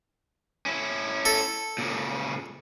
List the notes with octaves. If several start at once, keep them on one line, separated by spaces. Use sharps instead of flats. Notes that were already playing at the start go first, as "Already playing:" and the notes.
C#4 E4
A4
A#2 C#3